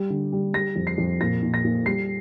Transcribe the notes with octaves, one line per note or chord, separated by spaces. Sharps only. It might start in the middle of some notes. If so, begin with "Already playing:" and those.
Already playing: G3
D3
G3
G3 A#6
F2
C7
F2
A#2 A#6
A#2
A#6
A#2
G3 C7